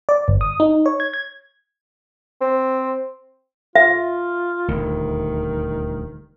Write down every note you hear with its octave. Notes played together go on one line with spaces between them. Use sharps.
D5
G1
D#6
D#4
C#5
G#6
G#6
C4
F4 E5
D#1 D2 D#3